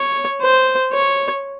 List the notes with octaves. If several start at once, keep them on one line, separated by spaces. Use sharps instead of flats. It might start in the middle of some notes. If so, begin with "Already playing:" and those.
Already playing: C#5
C5
C#5